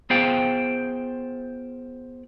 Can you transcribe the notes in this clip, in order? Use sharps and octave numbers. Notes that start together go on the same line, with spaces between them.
B3 F4 G#4 C5 F5 G5